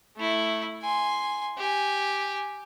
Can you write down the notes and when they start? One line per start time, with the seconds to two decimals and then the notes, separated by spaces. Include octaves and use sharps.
0.17 A3 E4
0.82 G#5 C6
1.58 G4 G#5